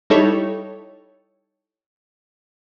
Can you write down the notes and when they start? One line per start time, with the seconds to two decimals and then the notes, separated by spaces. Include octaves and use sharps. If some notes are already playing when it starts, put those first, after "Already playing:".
0.10 G3 D#4 E4 A4 C#5